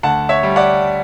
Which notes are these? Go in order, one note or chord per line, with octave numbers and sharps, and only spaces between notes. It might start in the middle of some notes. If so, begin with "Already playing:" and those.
D2 F#5 A5
C#5 E5
G3
D5 F#5